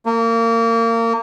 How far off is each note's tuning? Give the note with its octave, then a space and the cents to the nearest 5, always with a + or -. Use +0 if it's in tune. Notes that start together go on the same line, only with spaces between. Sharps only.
A#3 -25